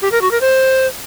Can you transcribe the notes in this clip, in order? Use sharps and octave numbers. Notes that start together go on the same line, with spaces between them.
G4
A#4
F#4
A#4
C5